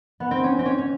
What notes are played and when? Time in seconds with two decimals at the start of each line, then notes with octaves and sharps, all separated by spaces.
0.20 B3
0.31 C4
0.44 C#4
0.59 C4
0.66 C#4
0.79 C#4